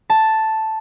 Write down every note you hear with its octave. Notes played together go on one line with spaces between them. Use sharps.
A5